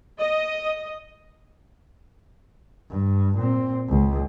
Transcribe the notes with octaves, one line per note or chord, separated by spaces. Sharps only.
D#5
G2
A#2 C4
C#2